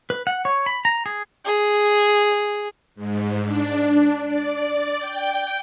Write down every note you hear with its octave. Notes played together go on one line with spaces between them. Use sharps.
B4
F#5
C#5
B5
A#5
G#4
G#4
G#2
D4
D5
G5